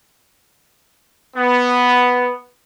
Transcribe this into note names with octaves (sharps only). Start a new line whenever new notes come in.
B3